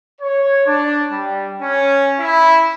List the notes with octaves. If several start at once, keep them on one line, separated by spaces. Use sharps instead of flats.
C#5
D4
G3
C#4
E4